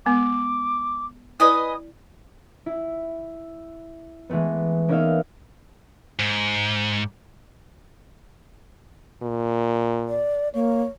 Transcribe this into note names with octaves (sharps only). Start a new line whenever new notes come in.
G#3 B3 D6
E4 B4 D5 D#5 G#5 D#6
E4
E3 G#3 A3 B3
A#3 B3 C#4 D#4 E5 F5
G#2
A#2
D5
A#3 C#5